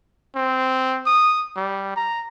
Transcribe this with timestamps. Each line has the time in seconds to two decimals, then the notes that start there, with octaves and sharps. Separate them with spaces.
0.35 C4
1.06 D#6
1.56 G3
1.96 A#5